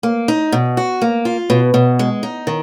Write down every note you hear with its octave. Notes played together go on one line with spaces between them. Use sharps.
A#3
D#4
B2
F#4
A#3
F4
B2
B2
G#3
D#4
D#3